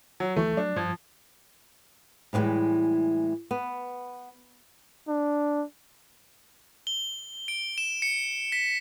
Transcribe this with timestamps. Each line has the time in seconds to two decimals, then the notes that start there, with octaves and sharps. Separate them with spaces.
0.20 F#3
0.36 D2 E3 A3 C#6
0.57 F#3 D4
0.76 G2 F3 G#6
2.33 A2 E3 F3 G3 G#3
3.51 B3
5.09 D4
6.87 G7
7.48 D7
7.78 E7
8.02 C#7
8.52 B6